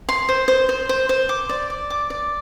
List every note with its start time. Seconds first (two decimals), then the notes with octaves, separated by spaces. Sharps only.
0.09 C6
0.29 C5
0.48 C5
0.69 C5
0.89 C5
1.09 C5
1.29 D6
1.49 D5
1.70 D5
1.90 D6
2.10 D5